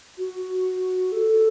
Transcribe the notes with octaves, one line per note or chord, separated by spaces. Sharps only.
F#4
A4